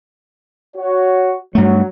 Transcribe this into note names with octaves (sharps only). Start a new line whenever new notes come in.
F#4 C#5
G2 F#3 A3